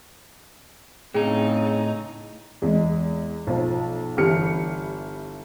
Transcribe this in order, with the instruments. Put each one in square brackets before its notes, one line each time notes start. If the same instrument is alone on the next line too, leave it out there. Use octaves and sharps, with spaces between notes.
[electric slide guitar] A2 D#4 [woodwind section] C#3 C4 [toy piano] G#4 C#5 G5
[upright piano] E2 G#3
B1 F3
G1 E3 G3 F6 C#7